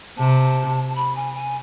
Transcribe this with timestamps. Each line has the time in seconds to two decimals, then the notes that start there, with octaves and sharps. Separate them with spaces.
0.17 C3 A5
0.95 B5
1.16 G#5
1.34 G#5